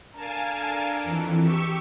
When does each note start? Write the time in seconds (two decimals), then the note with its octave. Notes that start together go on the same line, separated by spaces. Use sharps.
0.16 D4 A4 A#4 F5 G#5 A5
1.04 F2 E3
1.42 G4 C#6 E6